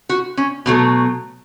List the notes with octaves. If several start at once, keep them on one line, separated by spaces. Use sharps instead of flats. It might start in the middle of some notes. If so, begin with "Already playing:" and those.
F#4
C#4
B2 F#3 A3